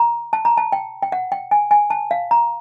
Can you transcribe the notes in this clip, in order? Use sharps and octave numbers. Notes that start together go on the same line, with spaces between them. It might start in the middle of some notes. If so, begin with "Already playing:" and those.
Already playing: A#5
A5
A#5
A5
G5
G5
F#5
G5
G#5
G#5
A5
F5
A#5